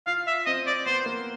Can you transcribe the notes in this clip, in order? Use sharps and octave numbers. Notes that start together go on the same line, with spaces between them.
F4 F5
E5
C4 D#5
D5
B3 C5
A#3